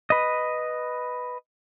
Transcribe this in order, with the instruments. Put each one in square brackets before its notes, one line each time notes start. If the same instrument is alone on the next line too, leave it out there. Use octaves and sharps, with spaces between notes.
[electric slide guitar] B4 D#5